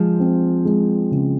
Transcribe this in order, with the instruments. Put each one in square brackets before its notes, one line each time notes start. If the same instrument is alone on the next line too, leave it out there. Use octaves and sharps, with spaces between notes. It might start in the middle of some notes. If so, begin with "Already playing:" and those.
Already playing: [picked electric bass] F3 [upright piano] G#3
[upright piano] C4
G#3
C#3